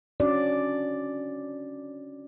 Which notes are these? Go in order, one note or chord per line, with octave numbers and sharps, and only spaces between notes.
C#4 D4 F#4 D5